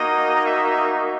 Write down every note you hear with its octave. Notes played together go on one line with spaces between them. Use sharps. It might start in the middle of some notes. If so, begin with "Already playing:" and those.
Already playing: A#3 D#4 F#4 D#5
E5